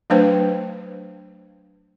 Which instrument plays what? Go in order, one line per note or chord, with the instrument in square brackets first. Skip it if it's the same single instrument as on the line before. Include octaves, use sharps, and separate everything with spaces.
[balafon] F#3 A3 D4 B4 C5 G5